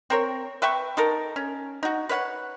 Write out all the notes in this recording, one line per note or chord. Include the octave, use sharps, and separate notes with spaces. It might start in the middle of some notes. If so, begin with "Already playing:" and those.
C4 A#4 C#5
B4 E5 G5 C#6
D#4 A4 A#4
C#4
D#4 F#4
B4 C#5 F5 F#5